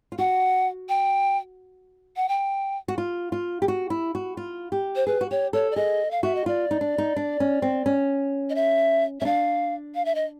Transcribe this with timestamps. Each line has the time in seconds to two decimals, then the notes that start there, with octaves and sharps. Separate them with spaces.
0.12 F4
0.19 F#4 F#5
0.89 G5
2.16 F#5
2.29 G5
2.88 F#4
2.98 F4
3.32 F4
3.62 G4
3.68 F#4
3.90 E4
4.15 F#4
4.37 F4
4.72 G4
4.96 C5
5.07 G#4 B4
5.21 F#4
5.31 G4 C#5
5.53 A4 C#5
5.71 D5
5.76 G#4 D#5
6.11 F5
6.23 F#4 E5
6.35 D#5
6.46 F4 D5
6.71 D#4
6.81 D4
6.98 D#4
7.16 D4
7.40 C#4
7.62 C4
7.86 C#4
8.50 D#5
8.55 E5
9.20 C#4 E5
9.25 D4 F5
9.95 F5
10.05 E5
10.15 D#5